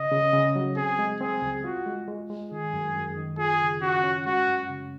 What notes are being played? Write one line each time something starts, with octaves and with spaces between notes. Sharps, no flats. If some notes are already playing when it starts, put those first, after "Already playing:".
Already playing: C#3 D#5
C#3
C#3
F#3
C4 G#4
G#3
C4 G#4
C#2
F4 F#4
G#3
G#3
G#3
D#3 G#4
F#2
F#2
D#3
F4 G#4
C#3
C#4 F#4
C#4
G#3 F#4
F#2
C#3